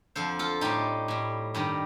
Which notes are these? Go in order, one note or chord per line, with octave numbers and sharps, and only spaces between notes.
F2 D3 F3 A4 C5
F4 A4
A2 G3 D#4 G4
A2 G3
G2 D#3 G3